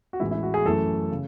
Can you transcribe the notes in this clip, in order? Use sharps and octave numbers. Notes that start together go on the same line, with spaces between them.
F#4
A1 A2 E3 G#3 E4
E4
F#4
G#4
F#2 E3 A3 A4
C#3